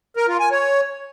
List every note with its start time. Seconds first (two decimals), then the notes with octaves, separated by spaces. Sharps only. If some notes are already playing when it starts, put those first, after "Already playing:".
0.17 A#4
0.28 F4
0.40 G#5
0.51 C#5